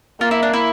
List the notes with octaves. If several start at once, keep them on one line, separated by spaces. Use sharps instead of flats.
A#3 F4
E4
D4
E4